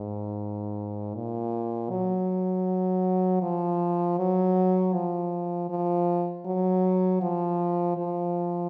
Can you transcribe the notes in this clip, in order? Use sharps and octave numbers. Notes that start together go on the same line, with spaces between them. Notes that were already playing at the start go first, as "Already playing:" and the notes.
Already playing: G#2
A#2
F#3
F3
F#3
F3
F3
F#3
F3
F3